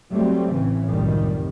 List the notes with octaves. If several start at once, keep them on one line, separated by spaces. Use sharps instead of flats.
F#3 G3 A3 C4
A1 C#3 E3
F1 C2 F#2 A2 D#3 G3